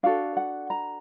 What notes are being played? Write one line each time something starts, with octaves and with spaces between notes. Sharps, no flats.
D4 F#4 A4 F5
F#5
A#5